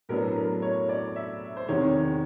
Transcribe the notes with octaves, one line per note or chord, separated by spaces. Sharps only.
A2 F#3 B3 D4 A#4
A#4
C#5
D5
E5
C5
E2 C3 D#3 C#5